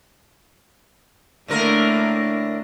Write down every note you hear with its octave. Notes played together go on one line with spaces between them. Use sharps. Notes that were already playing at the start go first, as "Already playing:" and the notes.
A2 D3 A3 A#3 A#4